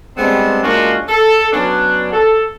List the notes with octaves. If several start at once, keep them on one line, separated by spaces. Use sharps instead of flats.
G3 G#3 B3 C4 D4
G#3 A#3 C#4 D4 F4 F#4
A4
F#3 B3 C#4 D4
A4